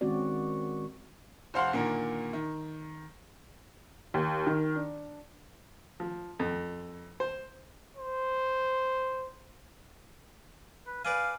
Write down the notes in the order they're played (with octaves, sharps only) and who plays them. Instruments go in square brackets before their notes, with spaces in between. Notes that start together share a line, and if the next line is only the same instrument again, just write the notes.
[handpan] D#3 G#3 C4 C#4 F#4 D5
[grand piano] F1 C5 F5 F#5 C6
A#2 D3 D#3 A#3
D#3
[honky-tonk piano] D#2
D#3
D4
[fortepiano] F3
F2
C5
[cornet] C5
[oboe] B4
[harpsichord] B4 D5 G#5 [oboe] F5